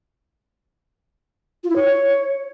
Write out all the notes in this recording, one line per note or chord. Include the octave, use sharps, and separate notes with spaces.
F4
E4
C#5